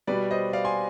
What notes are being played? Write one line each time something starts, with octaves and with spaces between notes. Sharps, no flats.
B2 G3 B4 D5
C5 D#5
D5 F5
G#5 C6